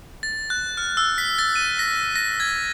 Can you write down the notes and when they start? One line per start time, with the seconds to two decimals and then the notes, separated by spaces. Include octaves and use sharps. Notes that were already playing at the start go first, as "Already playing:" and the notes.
0.23 A6
0.50 F#6
0.77 F6
0.97 E6
1.18 B6
1.39 A6
1.56 D#7
1.79 A#6
2.16 A#6
2.40 G#6